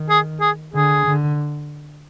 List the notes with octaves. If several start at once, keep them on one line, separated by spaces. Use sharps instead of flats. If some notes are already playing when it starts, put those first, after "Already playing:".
Already playing: D#3
G#4
G#4
D3 G#4
D3